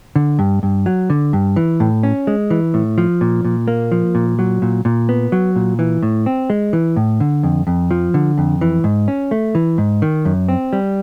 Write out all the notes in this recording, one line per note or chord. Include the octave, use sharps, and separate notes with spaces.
D3
G2
G2
F#3
D3
G2
E3
A2
C#4
G#3
E3
A2
F3
A#2
A#2
A#3
F3
A#2
F#3
A#2
A#2
B3
F#3
A#2
E3
A2
C4
G#3
E3
A2
D3
F2
F2
F3
D3
F2
E3
G#2
C#4
A3
E3
G#2
D#3
F#2
C4
G3